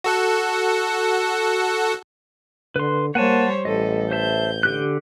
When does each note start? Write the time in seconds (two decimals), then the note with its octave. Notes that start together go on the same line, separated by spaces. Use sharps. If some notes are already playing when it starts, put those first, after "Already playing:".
0.04 F#4 A4 F#5
2.76 D3 B4 C6
3.15 G3 A#3 C5 C#5 F#5 G#5 A5
3.65 A1 G3 A4 D#5
4.11 C5 E5 A5 G6
4.63 D3 G4 F#6